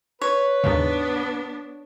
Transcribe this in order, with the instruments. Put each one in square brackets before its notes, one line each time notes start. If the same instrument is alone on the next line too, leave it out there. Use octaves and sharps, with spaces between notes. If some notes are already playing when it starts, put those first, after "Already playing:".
[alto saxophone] B4 [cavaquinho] C#5
[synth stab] D#2 G#2 C#3 [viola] B3 D4